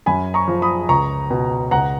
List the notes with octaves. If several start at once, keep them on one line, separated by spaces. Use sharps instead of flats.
F#2 G#5 B5
A#5 C#6
F3
B5 D#6
C#2 A#5 C#6
B2
C#2 F#5 A#5